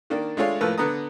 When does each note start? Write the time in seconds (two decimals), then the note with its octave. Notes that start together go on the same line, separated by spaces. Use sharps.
0.10 D#3 A#3 D4
0.37 G#3 A3 D4 F4 C#5 F5
0.61 A2 F3 A#3 B4 E6
0.78 D3 B3 B4 A#5 D#6